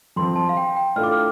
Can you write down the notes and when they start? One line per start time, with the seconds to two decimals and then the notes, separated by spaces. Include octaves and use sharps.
0.16 F2 F3 C4 C6
0.36 A5
0.49 F5
0.57 G5
0.76 G5
0.96 A2 A3 D4 F4 A4 F6
1.03 D6
1.12 F6